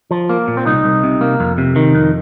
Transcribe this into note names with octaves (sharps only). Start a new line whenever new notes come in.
F3
A#3
A#2
C4
C2 D#4
C2
C3
A#3
F2
C3
D#3
F2